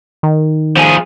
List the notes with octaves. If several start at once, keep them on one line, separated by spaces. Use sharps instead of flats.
D#3
F3 G#4